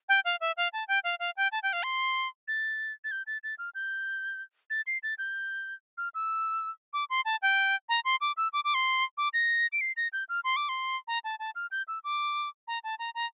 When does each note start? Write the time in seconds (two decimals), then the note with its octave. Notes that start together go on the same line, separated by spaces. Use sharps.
0.09 G5
0.25 F5
0.41 E5
0.57 F5
0.73 A5
0.88 G5
1.04 F5
1.20 F5
1.37 G5
1.52 A5
1.63 G5
1.73 F5
1.83 C6
2.48 A6
3.04 A6
3.11 G6
3.27 A6
3.44 A6
3.59 F6
3.75 G6
4.70 A6
4.87 C7
5.03 A6
5.18 G6
5.98 F6
6.14 E6
6.93 D6
7.10 C6
7.25 A5
7.42 G5
7.89 A#5
8.05 C6
8.21 D6
8.37 E6
8.53 D6
8.64 D6
8.74 C6
9.18 D6
9.33 A#6
9.73 D7
9.81 C7
9.97 A#6
10.13 G6
10.29 F6
10.44 C6
10.56 D6
10.69 C6
11.08 A#5
11.24 A5
11.39 A5
11.55 F6
11.71 G6
11.88 E6
12.04 D6
12.68 A#5
12.84 A5
12.99 A#5
13.15 A#5